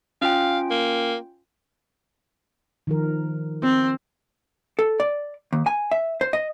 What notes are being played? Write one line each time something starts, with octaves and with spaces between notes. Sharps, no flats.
C#4 F4 F5 G5
A#3
D#3 F3 A#4
C4 F4
A4
D5
D#2
G#5
E5
C5
D#5